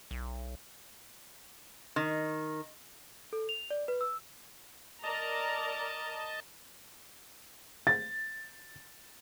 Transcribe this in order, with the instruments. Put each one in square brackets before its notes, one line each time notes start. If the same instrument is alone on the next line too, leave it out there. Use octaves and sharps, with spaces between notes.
[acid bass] B1
[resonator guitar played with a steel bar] D#3
[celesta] A4
F7
D5
B4
E6
[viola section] A#4 D5 A#5 [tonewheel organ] D#5 A5
[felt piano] A6